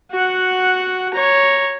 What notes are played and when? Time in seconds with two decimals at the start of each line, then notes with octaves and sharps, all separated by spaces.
0.11 F#4 F#5
1.14 C#5 A#5